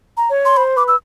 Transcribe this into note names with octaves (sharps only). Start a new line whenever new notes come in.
A#5
C#5
C6
C5 B5
B4 D6
E6